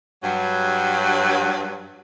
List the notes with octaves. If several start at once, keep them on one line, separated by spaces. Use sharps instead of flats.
G2 F#3